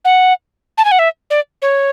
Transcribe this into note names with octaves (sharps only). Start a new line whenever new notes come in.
F#5
A5
G#5
F#5
E5
D5
C#5